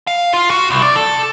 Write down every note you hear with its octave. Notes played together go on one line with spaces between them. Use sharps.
F5
F4
F#4
C2
D5
A4